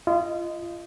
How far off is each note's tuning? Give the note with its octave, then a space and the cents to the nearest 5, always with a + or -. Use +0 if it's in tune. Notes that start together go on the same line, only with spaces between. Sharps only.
F4 -30 D#5 +0